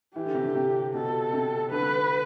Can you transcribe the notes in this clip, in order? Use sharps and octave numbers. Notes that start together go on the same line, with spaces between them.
E3 G4
D3
C3
D3
C3
B2 A4
C3
D3 B4